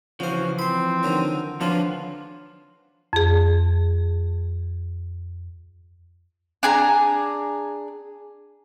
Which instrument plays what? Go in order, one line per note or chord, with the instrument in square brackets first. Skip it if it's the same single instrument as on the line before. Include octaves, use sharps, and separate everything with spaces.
[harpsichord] C#3 C5 [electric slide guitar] E3 F3 [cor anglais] F#4
[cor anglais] C4 [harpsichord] B5 C6
[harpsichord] D3 D#3 F#3
[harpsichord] D3 F#3 D4 [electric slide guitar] F3 B4 C5 [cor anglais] F4
[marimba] F2 G#4
[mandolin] D4 G#4 A#5